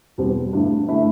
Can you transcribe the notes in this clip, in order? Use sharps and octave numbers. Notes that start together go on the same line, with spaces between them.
E2 B2 G3 C4
G2 D3 A3 E4
D3 A3 E4